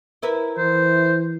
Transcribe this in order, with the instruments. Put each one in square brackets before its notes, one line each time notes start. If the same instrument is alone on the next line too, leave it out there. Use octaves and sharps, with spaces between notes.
[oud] E4 A#4 B4
[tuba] E3 [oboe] C5